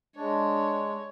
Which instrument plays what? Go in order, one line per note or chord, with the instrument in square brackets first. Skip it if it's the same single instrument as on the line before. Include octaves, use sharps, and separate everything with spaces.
[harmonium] G#3 [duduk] D4 [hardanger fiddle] C#5